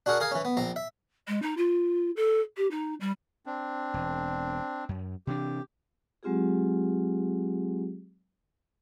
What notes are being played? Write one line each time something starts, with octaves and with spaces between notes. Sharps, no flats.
D4 F#4 G#4 A#4 F#5
G#4 A#4 F5 G#5
E3 C#4
B3
A#1 C4 A#5
E5
G#3
D#4
F4
A4
G4
D#4
G3
C4 D4
E1
F#2
C3 E3 D4 G4
F#3 G#3 C4 F4 G4 G#4